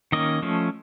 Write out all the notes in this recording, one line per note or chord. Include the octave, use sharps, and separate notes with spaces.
D#3 A#3 C#4 D#5
F3 A3 C#4